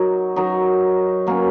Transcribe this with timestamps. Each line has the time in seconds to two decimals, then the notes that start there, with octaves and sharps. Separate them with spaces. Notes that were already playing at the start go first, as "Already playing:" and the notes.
Already playing: F#3 D#4 A#4
0.36 F#3 D#4 A#4
1.27 F#3 A#3 C#4